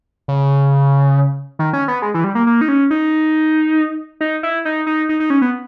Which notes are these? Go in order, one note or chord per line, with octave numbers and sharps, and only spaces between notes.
C#3
D#3
C#4
B3
G#3
E3
G3
A#3
A#3
D#4
C#4
D#4
D#4
E4
D#4
D#4
D#4
D#4
C#4
B3